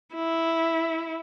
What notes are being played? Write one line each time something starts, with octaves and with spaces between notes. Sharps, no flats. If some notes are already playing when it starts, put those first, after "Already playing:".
E4